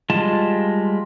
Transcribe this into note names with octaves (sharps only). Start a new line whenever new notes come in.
G3 G#3 F4 A5